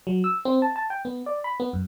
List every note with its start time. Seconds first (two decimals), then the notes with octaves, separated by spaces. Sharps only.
0.07 F#3
0.24 E6
0.45 C4
0.62 A5
0.76 A5
0.90 G5
1.05 B3
1.26 D5
1.44 B5
1.60 B3
1.73 F#2